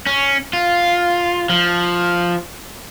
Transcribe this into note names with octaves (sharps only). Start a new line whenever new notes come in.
C#4
F4
F3